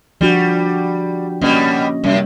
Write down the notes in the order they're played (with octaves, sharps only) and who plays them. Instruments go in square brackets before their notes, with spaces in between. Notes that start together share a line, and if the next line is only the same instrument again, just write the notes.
[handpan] F3 D4 F#4 [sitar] G3
[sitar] B2 G3 [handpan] A#3 C#4 D#5
[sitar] F#2 [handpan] C3 G3